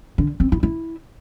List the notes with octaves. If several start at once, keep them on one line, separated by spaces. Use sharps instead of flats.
D3
C4
E4
E4